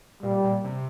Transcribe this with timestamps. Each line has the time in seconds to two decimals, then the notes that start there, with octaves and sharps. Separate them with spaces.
0.23 A#2 G3
0.44 A#2
0.64 C3